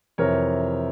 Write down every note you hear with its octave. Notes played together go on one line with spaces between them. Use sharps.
F2 C3 E3 A#4 C#5